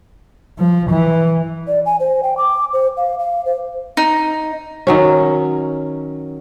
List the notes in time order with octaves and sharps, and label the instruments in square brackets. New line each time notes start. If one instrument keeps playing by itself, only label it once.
[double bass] F3
E3
[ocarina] D5
G#5
C5
G5
D6
C5
F5
F5
C5
[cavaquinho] D#4
[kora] D#3 F#3 C#4